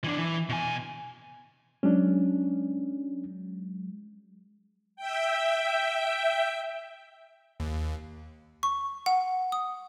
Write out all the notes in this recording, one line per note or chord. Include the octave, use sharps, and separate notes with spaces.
E3 D4
E3
B2 G#5
F#3 G#3 C#4 D4
E5 G5
D#2
C#6
F#5
D#6